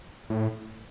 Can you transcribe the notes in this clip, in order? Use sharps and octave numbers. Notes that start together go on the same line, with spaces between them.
A2